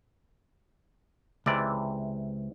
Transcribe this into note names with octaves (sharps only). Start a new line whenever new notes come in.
C#2 C3 E3 D5